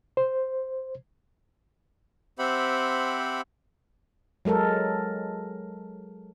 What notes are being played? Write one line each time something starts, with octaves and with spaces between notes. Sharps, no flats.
C5
C4 G4 C5 E5 F#5 B5
F#3 G#3 A4 A#4